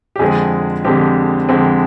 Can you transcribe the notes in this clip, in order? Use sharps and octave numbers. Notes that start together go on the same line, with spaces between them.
G4
F2 D3 G#3 C4 G#4
F2 D3 G#3 C4 G4
F2 D3 G#3 C4